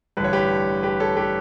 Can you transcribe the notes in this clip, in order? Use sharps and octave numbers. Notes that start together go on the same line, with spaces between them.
A1 G2 D3 B4
C#5
G4 B4
G4 B4
A4 C#5
G4 B4